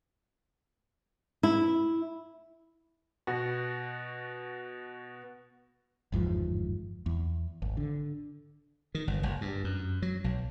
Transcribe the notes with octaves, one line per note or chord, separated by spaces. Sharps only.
E4
B2 F#4
G1 E2 G#2 F3
E2
G#1
D3
D#3
G1
F#1
G2
F#2
F#3
B1